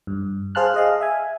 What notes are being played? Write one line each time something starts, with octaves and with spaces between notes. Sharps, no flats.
G2
G#4 C5 F5 A5 F6 F#6
G#4 D#5 F5
E5 G#5